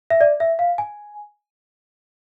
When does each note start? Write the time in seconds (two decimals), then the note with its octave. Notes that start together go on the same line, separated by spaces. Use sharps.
0.10 E5
0.21 D5
0.40 E5
0.59 F5
0.78 G#5